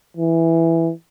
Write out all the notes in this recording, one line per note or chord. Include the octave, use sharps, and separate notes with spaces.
E3